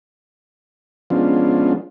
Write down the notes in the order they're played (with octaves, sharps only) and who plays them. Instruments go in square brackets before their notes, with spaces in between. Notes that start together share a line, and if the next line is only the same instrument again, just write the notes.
[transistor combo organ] F3 G#3 B3 C#4 D4 F4